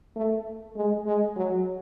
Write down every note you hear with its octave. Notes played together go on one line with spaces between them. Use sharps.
A3
G#3
G#3
F#3